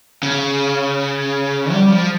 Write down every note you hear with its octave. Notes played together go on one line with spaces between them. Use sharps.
C#3
G3
F3